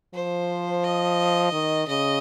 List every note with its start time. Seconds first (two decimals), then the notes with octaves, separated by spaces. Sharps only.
0.14 F3 C5
0.84 D#5
1.52 D#3
1.88 C#3 D#5